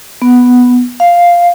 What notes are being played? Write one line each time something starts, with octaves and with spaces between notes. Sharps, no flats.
B3
F5